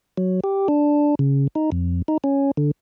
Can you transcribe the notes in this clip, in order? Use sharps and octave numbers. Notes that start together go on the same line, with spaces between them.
F#3
G4
D4
C#3
D#4
F2
D#4
C#4
D3